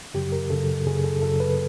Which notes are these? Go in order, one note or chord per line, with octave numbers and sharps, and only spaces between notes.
F#2 C#3 F#3 G4
A#4
F#2 C#3 F#3 A4
F#2 C#3 F#3 G#4
A4
F#2 C#3 F#3 A4
B4